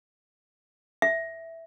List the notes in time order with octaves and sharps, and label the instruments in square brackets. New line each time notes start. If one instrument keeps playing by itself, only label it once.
[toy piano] E5